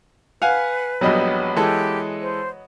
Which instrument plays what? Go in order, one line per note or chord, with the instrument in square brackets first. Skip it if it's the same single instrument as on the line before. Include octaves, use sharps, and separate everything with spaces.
[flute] B4 [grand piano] F5 G#5 [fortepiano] F#5
[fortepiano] A#1 G3 [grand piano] F#3 B3 D#5
[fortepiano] E3 G#3 A4 [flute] G4
[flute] C5